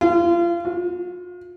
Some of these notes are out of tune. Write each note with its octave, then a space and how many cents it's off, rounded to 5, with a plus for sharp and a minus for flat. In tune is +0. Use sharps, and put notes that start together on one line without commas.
F4 -30
F4 +40